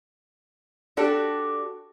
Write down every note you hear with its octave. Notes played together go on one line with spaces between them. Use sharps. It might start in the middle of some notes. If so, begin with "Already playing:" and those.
D4 F#4 G4 A4